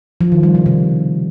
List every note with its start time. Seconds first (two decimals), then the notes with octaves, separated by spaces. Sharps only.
0.21 F3
0.32 D#3
0.43 G3
0.55 C#3
0.66 C3